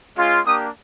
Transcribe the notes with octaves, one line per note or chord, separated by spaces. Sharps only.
G#3 C#4 F4
A#3 D4 G4 D#6